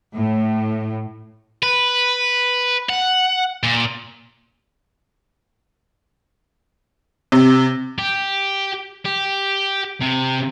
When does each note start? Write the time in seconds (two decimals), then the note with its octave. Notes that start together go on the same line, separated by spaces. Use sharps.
0.14 A2
1.63 B4
2.89 F#5
3.63 A#2
7.32 C3
7.98 G4
9.05 G4
10.01 C3